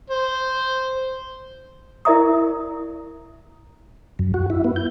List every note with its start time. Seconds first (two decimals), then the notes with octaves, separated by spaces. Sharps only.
0.10 C5
2.05 E4 A#4 D5 E5 A#5 D#6
4.19 F#2
4.34 F#4
4.50 E4
4.64 B3
4.76 G6